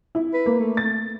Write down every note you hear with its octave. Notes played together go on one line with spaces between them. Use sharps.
E4
B4
A#3
A3
A6